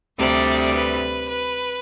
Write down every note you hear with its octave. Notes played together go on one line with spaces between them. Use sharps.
D2 C3 G3 D5
B4
B4